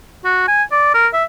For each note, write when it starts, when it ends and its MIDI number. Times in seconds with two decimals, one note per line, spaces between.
0.24 0.46 66
0.48 0.63 80
0.72 0.92 74
0.94 1.07 70
1.13 1.24 76